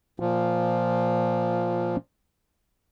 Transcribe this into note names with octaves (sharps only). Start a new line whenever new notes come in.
A#2 F3